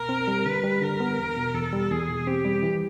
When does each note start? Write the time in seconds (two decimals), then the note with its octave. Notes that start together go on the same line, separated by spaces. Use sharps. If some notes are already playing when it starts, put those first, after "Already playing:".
Already playing: C2 B2 A#4
0.09 C4
0.28 G3
0.45 D3 B4
0.63 G3
0.82 D3 A#4
1.00 B3
1.18 E2
1.36 B2
1.54 E2 A4
1.73 G3
1.90 E2 G#4
2.09 B2
2.27 C4 G4
2.45 G3
2.63 E3